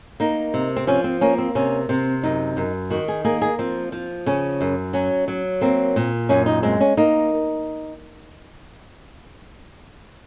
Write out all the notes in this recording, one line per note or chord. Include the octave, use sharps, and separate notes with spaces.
A#3 D#4
C3
C4
F3 C#4
C4
A#3 C#4
C4
C3 C#4
C3 C4
F#2 D#4
F#2
D#3 F#4
G#4
A#3 G#4
G#4
F3 C4
F3
C#3 C#4
F#2
F#3 C#4
F#3
A#3 C4
A#2
F#2 C#4
D#4
G#3 C4
C#4
A#3 D#4